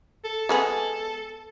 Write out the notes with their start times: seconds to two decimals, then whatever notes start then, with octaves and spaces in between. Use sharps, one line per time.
0.25 A4
0.49 G#3 B3 G#4